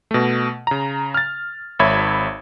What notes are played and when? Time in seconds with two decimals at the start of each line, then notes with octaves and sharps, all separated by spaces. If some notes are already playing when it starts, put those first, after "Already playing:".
0.11 B2 A3
0.67 C#3 A#5
1.14 F6 A6
1.79 G#1 C#5 E5 B5 G#6